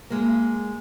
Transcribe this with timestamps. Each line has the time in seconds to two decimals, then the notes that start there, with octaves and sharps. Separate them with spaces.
0.10 G#3 A#3